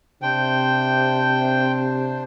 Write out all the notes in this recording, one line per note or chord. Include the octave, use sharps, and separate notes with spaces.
C3 D4 C5 G5